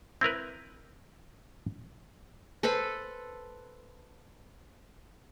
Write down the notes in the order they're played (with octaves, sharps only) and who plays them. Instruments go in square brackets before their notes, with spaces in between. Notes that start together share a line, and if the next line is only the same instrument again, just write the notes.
[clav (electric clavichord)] C4 E4 A#4 B4
[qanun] A4 B4 C5 B5